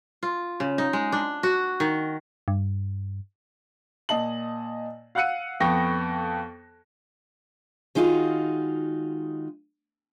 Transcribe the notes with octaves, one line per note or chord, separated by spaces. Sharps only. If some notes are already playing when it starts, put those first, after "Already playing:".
F4
C#3
D#4
G#3
D4
F#4
D#3
G2
A#2 D#5 A5 F#7
F5 F#5 E6 F#6 C#7 D#7
F2 B3 A4 G5 C#6 A#6
D#3 G#3 D#4 F4 F#4